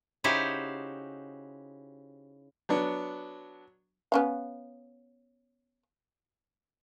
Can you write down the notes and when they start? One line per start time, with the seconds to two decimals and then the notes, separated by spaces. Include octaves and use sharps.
0.24 C#3 D#4 E4 F#4 G4 C5
2.69 F#3 B3 D4
4.12 B3 C#4 F5